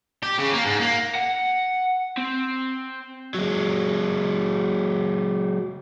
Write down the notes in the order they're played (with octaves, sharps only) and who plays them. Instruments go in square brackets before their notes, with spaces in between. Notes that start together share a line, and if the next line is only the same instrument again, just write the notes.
[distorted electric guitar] G4
C#3
A#3
G#2
A#3
[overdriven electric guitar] F#5
C4
F#3 G#3